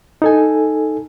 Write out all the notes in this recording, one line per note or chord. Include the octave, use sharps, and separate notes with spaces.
D#4 A4 G#5